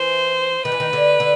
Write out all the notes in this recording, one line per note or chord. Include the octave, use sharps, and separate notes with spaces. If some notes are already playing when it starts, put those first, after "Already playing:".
Already playing: E3 C5
D#3 B4
E3
D#3
D3
D3